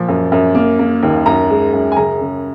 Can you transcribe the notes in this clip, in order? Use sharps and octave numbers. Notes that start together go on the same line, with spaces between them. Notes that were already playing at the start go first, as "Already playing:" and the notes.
Already playing: A#2 F3
F#2
F#2
A#3
A#3
D#2
F#2 A#5
G#3
F#2
G#5
C#3 A#5
C#3